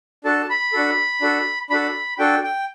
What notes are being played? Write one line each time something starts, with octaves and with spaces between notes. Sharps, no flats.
D4 F#4 A4 A5
B5
D4 F#4 A4
D4 F#4 A4
D4 F#4 A4 B5
D4 F#4 A4 G5
G5